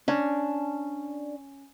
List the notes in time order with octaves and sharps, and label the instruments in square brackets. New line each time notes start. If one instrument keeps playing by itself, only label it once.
[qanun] C#4 [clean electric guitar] D4